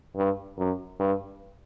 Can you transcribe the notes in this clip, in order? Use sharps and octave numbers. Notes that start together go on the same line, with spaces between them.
G2
F#2
G2